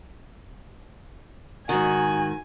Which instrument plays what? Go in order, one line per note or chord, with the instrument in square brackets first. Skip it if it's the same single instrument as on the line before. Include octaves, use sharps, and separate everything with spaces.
[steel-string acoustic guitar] G#2 D#3 [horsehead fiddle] F#4 [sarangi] G#5